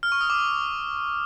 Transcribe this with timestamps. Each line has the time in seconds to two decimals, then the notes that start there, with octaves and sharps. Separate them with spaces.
0.03 F6
0.12 C#6
0.21 D#6
0.30 D6